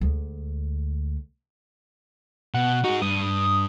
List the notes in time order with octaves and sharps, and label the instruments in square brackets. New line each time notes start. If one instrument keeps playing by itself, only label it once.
[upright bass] D2 G#3
[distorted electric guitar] B2 [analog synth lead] F#5
[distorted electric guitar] D#4 G#4 [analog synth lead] F#4
[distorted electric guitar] G2 [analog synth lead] D#6